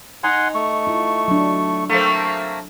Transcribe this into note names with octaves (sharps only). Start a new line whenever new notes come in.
D#4 F#5 G#5 C6
A3 C#6
E4 F4
F#3 D4
A3 A#3 C4